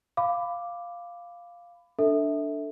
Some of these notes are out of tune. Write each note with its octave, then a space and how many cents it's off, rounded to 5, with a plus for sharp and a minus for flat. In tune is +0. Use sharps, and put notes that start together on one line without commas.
F5 +0 B5 +20 D6 +0
D4 +0 A4 +20 E5 -20